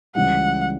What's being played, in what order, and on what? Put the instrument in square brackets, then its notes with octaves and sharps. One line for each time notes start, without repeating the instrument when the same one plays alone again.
[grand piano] C#2 C#3 E3 G3 [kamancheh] F#5